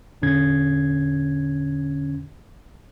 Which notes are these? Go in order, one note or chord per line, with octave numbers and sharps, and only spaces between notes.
E2 A#2 D3 C#4 G#6